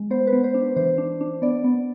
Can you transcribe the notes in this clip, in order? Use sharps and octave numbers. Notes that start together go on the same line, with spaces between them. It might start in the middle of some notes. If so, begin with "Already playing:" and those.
Already playing: G#3
B3 C5
B4
B3
C5
D4
E3 C5
D4
D4
B3 D5
B3